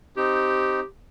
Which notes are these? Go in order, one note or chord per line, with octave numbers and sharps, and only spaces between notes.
C4 D#4 G4